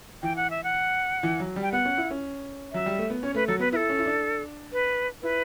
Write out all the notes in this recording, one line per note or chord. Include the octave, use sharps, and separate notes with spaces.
E3 G5
F#5
E5
F#5
E3
F#3
G3
G5
B3 F#5
C#4
E4
C#4
F#3 E5
G3
A3
B3
C#4 C#5
A3 B4
F#3 A4
B3 B4
E4 A4 B4
C#4
E4
D4
B4
E4 B4